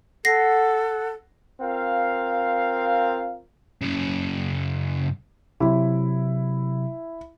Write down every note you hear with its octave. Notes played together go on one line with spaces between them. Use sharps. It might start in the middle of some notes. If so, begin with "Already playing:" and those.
A4 F#5 A#6 C7
C4 F4 A#4 F5
F#2 C#3
C3 F#3 E4